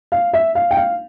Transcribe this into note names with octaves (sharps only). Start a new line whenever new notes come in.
F5
E5
F5
G5
F5